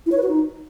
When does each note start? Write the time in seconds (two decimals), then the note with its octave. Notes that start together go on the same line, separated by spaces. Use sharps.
0.06 E4
0.12 C#5
0.17 B4
0.23 F#4
0.28 D#4